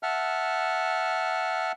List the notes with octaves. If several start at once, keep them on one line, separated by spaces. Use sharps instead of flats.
E5 F#5 A5 F6